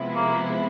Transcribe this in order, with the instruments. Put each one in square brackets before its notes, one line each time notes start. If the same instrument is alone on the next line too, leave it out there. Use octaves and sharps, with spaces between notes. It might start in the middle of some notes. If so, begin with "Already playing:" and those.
Already playing: [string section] C3 F3 G#3 B3 E4
[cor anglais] A#3